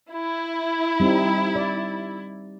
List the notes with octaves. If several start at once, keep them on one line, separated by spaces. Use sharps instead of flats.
E4
G3 C4 D#4
D5